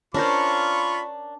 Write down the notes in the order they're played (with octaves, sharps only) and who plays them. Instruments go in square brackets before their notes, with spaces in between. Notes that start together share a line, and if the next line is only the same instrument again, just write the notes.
[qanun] C#4 A#4 C5 [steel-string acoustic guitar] D4 [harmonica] F4 F5 B5 [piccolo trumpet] C#6